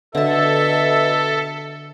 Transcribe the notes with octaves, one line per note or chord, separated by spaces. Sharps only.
B2 D3 A4 E5 A5